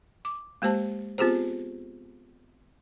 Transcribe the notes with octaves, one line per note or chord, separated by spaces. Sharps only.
D6
G#3 A#3 G4 C5 A5
B3 C4 F4 G4 G#4 C5